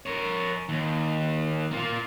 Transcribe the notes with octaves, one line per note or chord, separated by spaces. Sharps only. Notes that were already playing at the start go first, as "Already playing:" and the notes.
A#4 C#5
D#2
A#3 F4